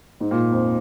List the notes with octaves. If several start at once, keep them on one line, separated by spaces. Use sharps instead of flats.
G#2
A#2
F2